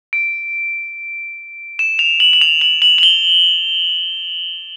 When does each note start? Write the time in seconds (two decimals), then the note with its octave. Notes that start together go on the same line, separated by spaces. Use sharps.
0.13 D7
1.79 E7
1.99 F7
2.20 F#7
2.33 F#7
2.41 F7
2.61 F#7
2.82 F#7
2.98 F#7
3.03 G7